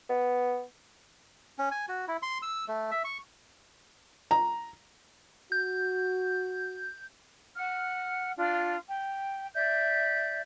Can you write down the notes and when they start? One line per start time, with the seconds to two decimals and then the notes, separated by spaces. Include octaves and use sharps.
0.09 B3
1.59 C#4
1.71 G#5
1.89 F#4
2.08 E4
2.23 C6
2.42 E6
2.68 A3
2.91 E5
3.04 C#6
4.31 A#5
5.52 F#4 G6
7.55 F#5 F6
8.36 D4 F4
8.86 G5
9.54 D5 E5 G6